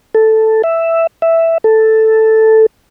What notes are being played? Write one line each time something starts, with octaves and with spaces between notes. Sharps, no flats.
A4
E5
E5
A4